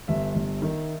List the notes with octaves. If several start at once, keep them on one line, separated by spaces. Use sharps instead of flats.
G1 E5
G1
D#3